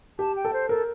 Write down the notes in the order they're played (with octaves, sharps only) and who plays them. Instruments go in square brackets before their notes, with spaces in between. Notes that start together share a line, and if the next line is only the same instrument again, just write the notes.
[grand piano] G4 [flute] A5
[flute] G5
[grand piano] A4
[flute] C5
[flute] A4 [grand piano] A#4